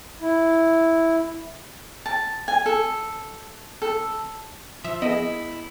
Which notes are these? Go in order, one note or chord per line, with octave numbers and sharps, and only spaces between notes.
E4
A5
G#5
A4
A4
F3 E5
B3 E4 G#4 D#5